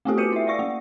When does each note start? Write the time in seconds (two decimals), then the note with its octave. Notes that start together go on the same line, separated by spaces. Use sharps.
0.05 A3 B3 C4 F4 G4 A4
0.18 F#4 B4 C#7 D#7
0.32 E4 E5
0.47 D5 F5 C#6 A#6
0.59 A#3